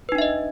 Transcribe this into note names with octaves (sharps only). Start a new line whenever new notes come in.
D4 D#4 B4 D#5 E5